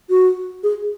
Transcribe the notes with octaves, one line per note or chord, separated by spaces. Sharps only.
F#4
G#4